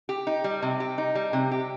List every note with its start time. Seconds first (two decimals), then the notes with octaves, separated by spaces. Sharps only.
0.09 G4
0.27 D#4
0.44 G3
0.62 C3
0.80 G4
0.98 D#4
1.15 G3
1.33 C3
1.51 G4